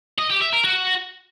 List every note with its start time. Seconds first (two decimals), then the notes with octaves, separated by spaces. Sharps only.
0.19 D#5
0.30 G4
0.41 E5
0.53 A#4
0.64 F#4